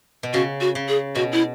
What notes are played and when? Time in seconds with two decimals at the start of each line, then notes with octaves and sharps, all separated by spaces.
0.23 B2
0.33 C#3 F#4
0.61 F#4
0.75 C#3
0.88 G#4
1.15 B2 F#4
1.32 E4